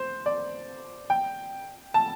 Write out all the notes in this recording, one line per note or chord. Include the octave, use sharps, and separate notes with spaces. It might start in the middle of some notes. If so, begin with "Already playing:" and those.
Already playing: C5
D5
G5
A5